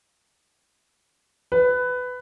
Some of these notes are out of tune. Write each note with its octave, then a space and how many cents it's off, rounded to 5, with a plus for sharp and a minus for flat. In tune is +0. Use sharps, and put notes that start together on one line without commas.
B4 +15